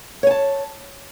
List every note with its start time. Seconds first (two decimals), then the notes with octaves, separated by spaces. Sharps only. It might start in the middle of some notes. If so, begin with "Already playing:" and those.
0.23 C#5
0.27 G#5
0.31 A5